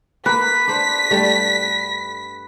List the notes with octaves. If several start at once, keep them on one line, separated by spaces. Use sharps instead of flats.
A#3 B4 B6
D4 C5
G2 G3 A3